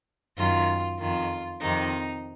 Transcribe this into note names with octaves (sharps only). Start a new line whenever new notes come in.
F#2 D#3 F4
F2 D#3 F4
F2 C3 D#3 D#4